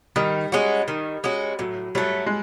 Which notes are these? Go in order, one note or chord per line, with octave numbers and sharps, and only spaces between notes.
D#3 G3
G#3 C#4 F#4
D#3
G#3 C#4 F#4
A2 F#3
F#3 G3 A3
G#3